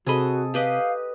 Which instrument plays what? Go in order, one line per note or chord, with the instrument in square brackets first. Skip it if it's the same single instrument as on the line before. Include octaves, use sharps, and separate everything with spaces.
[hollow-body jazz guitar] C3 B5 [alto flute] F#4 [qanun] G#4 A4 D#5
[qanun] G4 B4 D#5 [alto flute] F5